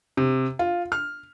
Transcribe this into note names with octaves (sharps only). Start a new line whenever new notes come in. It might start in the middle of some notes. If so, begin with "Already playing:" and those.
C3
F4
F6